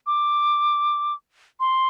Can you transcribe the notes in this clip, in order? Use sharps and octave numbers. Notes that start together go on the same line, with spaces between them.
D6
C6